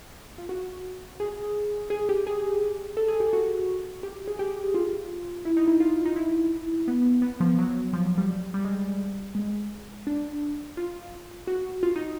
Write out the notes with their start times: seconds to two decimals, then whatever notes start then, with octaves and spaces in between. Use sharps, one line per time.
0.38 F4
0.49 F#4
1.20 G#4
1.90 G#4
2.09 G4
2.27 G#4
2.97 A4
3.08 G#4
3.20 G4
3.33 F#4
4.03 G4
4.28 G#4
4.39 G4
4.74 F4
5.45 E4
5.57 D#4
5.68 E4
5.80 F4
6.05 D#4
6.16 E4
6.88 B3
7.22 B3
7.40 F3
7.59 F#3
7.93 F3
8.05 F#3
8.18 G3
8.54 G3
8.65 G#3
9.35 G#3
10.07 D4
10.77 F4
11.47 F#4
11.83 F4
11.96 D#4